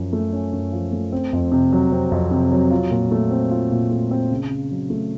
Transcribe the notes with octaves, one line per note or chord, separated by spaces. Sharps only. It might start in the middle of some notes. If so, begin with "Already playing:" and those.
Already playing: F#2 F3 C#4
A3
C#4
F#2
F3
A3
C4
F2
C3
F#3
C4
F2
C3
F#3
F4
A#2
A3
C4
F4
A#2
A3
C4
C#3
C#3
F#3
A3